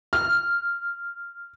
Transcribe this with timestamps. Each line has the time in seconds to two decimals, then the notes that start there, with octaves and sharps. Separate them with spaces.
0.13 F6